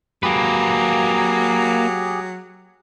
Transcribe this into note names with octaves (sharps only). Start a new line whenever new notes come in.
F#3 A#3 G4 G#4 B4